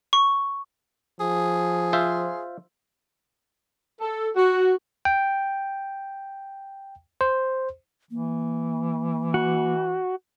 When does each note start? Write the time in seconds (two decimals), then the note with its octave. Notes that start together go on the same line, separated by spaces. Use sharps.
0.13 C#6
1.20 F3 G#4
1.93 F4 C5 E5
4.00 A4
4.36 F#4
5.05 G5
7.21 C5
8.11 E3 A#3
9.34 F#4